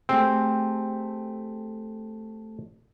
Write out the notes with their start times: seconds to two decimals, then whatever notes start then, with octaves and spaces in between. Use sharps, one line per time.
0.09 A3 C4 G4 G#4